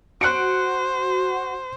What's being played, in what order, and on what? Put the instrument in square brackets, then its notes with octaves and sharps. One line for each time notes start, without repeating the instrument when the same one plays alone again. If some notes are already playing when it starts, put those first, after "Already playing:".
[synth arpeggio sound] F#4 [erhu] C5 [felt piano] F#6 C#7 D7